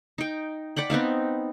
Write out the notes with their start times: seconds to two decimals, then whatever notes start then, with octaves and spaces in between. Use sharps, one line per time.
0.18 D#4 G5
0.76 D5 F#5 G5 B5
0.90 B3 C4 D#4 F5